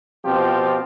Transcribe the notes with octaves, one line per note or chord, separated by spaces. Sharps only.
B2 F3 C4 F4 G4